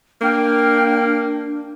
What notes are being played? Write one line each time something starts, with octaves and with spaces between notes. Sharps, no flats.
A#3 D4 G5 F6